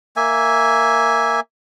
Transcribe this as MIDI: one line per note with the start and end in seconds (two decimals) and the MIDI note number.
0.16 1.40 58
0.16 1.40 76
0.16 1.40 80